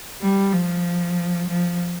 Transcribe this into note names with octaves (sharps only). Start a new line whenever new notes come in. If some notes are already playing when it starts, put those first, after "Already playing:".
G3
F3
F3